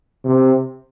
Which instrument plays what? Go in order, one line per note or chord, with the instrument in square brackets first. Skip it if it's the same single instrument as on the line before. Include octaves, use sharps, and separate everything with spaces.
[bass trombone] C3